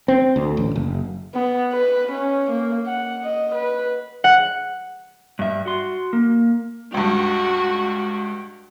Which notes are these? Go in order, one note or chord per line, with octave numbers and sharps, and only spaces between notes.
C4
D2
A1
F#1
B3
B4
C#4
A#3
F#5
D#5
B4
F#5
G2 E5
F#4 C6
A#3
C#2 G2 F#4